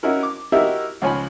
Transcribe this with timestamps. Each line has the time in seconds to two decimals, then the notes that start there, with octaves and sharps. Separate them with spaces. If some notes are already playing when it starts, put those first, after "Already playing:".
0.03 C#4 D#4 E4 F#4 A#4
0.23 D6
0.52 D#4 E4 F#4 G4 A#4 E5
1.02 C#2 F3 C#5 G#5 B5